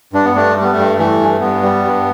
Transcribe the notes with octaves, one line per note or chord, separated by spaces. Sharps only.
G2 D4
B3
G2 A3 D4
G3 A3
B3
A3
G2
E3 A3
G2
G2 B3
G3
G2